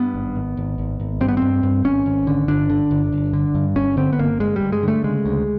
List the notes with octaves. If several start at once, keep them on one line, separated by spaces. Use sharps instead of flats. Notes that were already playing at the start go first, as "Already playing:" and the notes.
Already playing: G2 B3
G#1
G#1
G#1
G#1
G#1
G2 C4
B3
G2 C4
G2
G#1 C#4
G#1
D3
G1 D4
D3
G1
G1
D3
G2
G1 C#4
D3 C4
B3
G1 A#3
G1 G#3
G2 G3
G#3
D3 A3
C#3 G#3
D2